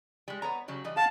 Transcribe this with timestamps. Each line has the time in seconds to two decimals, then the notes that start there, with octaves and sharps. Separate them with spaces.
0.28 G3 G#3
0.42 B3 C#5 A#5
0.68 C#3 F#3 G3
0.84 E3 G3 D#5
0.97 F5 F#5 A5